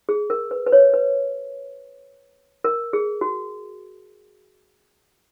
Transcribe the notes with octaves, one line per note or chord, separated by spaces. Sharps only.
G#4
A#4
B4
B4
C#5
B4
A#4
G#4
F#4